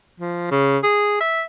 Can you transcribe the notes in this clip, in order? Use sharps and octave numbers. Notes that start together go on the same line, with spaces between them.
F3
C#3
G#4
E5